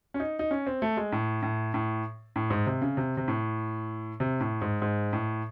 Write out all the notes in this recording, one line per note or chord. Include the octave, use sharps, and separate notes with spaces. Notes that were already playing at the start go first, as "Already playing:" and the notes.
C#4
D#4
D#4
C#4
C4
A3
G#3
A2
A2
A2
A2
G#2
C3
C#3
C3
C3
A2
C3
A2
G#2
G#2
A2